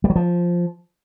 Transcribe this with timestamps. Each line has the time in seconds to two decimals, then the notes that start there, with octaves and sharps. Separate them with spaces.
0.04 G3
0.10 F#3
0.16 F3